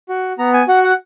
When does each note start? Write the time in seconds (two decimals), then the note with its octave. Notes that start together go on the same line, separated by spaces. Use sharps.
0.09 F#4
0.39 B3 A#5
0.54 G#5
0.68 F#4 F#5
0.84 F#5